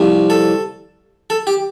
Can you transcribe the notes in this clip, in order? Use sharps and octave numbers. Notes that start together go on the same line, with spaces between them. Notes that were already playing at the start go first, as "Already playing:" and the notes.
Already playing: C2 C3 F3
A4
A4
G4